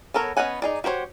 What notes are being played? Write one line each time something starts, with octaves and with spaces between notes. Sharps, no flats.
B3 A4 A#4 C#5
B3 C#4 D#5 F#5 G#5
D#4 G#4 D5
F#4 G4 C5 C#5